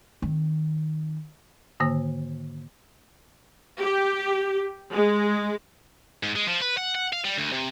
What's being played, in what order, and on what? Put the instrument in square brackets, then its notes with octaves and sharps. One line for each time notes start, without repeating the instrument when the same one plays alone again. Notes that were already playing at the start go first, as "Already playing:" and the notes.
[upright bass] D#3 C4
[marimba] G#2 D3 D#3 A#3
[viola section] G4
G#3
[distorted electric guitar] G#2
G#3
F3
B4
F#5
F#5
F5
G3
D2
C3